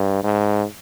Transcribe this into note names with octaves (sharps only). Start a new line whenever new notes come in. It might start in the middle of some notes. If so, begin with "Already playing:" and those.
Already playing: G2
G#2